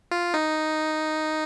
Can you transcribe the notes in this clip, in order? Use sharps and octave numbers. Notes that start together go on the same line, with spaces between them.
F4
D#4